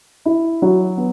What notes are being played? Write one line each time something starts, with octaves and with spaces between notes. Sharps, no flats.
E4
F#3
B3